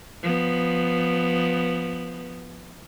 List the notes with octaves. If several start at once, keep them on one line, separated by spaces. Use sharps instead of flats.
F3 B3